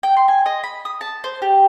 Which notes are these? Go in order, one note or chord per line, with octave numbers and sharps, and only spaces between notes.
G5
C6
G#5
D#5
B5
D#6
A5
C5
G4